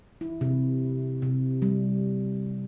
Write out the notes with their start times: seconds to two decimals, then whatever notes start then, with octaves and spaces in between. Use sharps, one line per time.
0.21 E4
0.41 C3
1.22 C3
1.62 G3